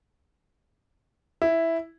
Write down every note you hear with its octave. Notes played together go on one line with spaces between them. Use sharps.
E4